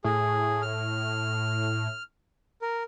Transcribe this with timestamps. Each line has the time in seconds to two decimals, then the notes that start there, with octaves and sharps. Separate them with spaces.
0.04 A2 G#4
0.62 F6
2.62 A#4